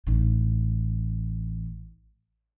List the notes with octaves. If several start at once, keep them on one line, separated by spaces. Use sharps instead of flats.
A1 D#4